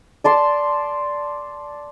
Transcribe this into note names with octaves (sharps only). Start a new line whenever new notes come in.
D5 A5 C6